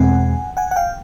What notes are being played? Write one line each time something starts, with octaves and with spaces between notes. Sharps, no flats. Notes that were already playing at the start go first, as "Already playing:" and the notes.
Already playing: E2 B2 G#3 C4 F#5 G#5
F#5 G#5
F#5
F5 G5